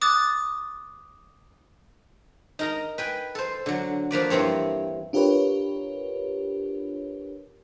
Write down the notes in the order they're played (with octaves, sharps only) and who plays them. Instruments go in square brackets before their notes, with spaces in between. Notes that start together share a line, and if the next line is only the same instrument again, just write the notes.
[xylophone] D6 D#6 F#6 A6
[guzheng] D#4 A#4 A#5
B4 G5 G#5
A4 C5
D3 F#3
F3 A#3 B4 D5
G2 E3 A#3 C4 C#5
[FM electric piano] D4 F4 G4 A#4 B4 C#5